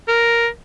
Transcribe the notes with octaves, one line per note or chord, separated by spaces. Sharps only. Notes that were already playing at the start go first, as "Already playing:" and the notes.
A#4